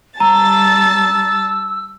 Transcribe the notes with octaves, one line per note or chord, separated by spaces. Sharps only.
G3 A5 A#5 E6 A6